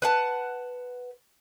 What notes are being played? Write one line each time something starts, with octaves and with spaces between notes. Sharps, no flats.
B4 F#5 A5